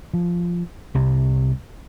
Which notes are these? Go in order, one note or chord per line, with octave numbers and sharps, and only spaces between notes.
F3
C2 C3